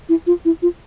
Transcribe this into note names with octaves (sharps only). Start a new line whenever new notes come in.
E4
F4
E4
F4